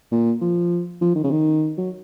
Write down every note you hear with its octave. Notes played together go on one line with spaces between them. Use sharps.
A#2
F3
F3
D#3
C#3
D#3
F#3